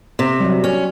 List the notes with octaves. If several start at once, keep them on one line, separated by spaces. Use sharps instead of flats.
C3
F#3 G3
C#4